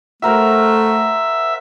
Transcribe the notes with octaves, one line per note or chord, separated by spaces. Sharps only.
A3 F#4 A#4 C5 E5